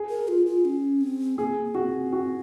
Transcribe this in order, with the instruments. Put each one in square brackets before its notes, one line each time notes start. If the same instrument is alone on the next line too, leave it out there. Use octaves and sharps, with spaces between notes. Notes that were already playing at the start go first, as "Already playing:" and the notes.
Already playing: [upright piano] G#4
[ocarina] A#4
F4
F4
C#4
C4
[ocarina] A#3 [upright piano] G#4
[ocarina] A#3
[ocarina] C4 [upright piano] F#4
[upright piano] F#4